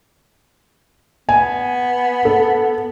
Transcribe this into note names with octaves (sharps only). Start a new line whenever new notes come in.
B3 G#5
A4